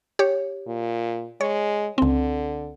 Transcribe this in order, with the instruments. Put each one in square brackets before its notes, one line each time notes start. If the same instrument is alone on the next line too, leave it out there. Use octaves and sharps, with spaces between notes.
[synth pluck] G4 C#5
[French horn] A#2
[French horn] G#3 [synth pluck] C#5
[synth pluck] C#2 C4 [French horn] D3